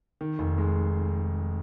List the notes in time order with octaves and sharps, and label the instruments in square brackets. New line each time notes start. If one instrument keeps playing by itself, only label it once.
[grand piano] D#3
F1
G#3